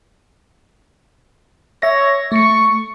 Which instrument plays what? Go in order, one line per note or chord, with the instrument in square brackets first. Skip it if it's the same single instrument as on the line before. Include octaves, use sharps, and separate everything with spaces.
[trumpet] C#5 [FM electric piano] E5 A#6
[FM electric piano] A3 C#7 [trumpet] C#6